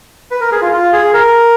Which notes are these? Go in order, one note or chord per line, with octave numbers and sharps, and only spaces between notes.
B4
A#4
G#4
F4
F4
G#4
A#4